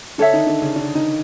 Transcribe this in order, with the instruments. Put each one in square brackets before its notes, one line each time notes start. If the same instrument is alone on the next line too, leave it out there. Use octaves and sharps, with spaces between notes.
[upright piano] D3 D4 [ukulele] A4 C#5 E5
[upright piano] D#3 D#4
D3 D4
C#3 C#4
D3 D4
D#3 D#4